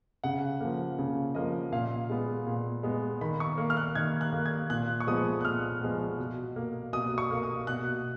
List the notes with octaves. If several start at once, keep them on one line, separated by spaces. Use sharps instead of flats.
C#3 F#5
F3 A#3
C#3
F3 A#3 D#5
A#2 F5
G#3 B3
A#2
G#3 B3
D#3 B5
C#6
A#3
F6
F#6
D#3 G#6
F#6
A#3
G#6
A#2 F#6
C#6
F3 G#3 B3 D#6
F#6
A#2 F6
F3 G#3 B3
B2
A#3
B2 D#6
C#6
A#3
D#6
B2 F#6